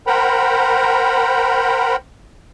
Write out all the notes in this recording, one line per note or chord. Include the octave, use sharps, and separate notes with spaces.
A#4 C5 F#5 G5 A#5 B5